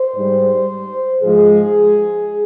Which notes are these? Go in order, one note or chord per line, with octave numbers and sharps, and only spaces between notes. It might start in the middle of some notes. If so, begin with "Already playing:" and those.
Already playing: C5
G#2 G3
G#2 F3 G#3 G#4